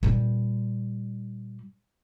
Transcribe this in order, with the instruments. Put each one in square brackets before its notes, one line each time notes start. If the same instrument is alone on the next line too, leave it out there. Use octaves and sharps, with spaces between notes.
[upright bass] A#2 G3